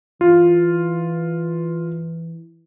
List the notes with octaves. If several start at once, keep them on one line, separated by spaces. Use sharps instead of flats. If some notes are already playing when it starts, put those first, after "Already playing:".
E3 F4